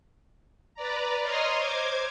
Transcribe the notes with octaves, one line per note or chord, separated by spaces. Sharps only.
B4 D5 A#5
C#5 D#5 A#5 C6 D#6 F6
C5 D6 G#6